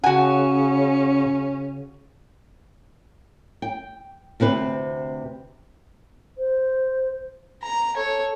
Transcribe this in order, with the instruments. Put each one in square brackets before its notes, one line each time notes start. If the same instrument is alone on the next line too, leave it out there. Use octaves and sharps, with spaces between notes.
[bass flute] C#3 [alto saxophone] C#4 [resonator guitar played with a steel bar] F#4 G#5 [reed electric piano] F#5
[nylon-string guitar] G5
D2 C3 C4 B4
[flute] C5
[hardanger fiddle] A#5
A4 C#5